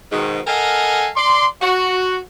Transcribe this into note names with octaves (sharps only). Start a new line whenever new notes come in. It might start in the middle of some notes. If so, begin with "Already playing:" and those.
G#2 B2 D#3
A4 A#4 D#5 F5 F#5 G#5
D5 C6
F#4